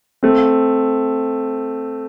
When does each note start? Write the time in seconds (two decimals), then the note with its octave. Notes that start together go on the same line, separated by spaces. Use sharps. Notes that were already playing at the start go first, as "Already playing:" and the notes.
0.23 A3 C4